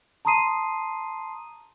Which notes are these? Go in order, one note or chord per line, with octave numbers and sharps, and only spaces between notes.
A5 A#5 C6 D#6 C7 D#7